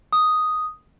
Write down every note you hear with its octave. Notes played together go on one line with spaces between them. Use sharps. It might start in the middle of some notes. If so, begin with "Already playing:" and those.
D#6